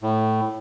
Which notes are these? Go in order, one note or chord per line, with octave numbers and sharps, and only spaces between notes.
A2